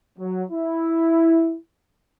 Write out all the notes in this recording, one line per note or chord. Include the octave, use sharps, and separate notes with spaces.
F#3
E4